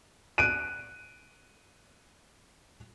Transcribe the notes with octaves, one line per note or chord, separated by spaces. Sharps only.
F#6 D7 D#7